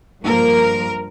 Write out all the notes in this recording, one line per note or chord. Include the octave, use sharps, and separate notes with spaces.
G2 F3 A#3 A#4